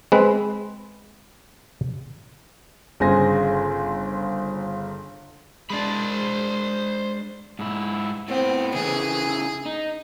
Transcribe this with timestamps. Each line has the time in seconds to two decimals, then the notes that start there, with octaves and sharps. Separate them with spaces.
0.12 G#3 C4 B4
3.00 G1 C#3 C5 G#5 C6 A#6
5.70 G#3 D4 C5 B5
7.59 G#2 E4
8.28 A2 B3 C4
8.74 C#3 E3 G#4
9.65 D#4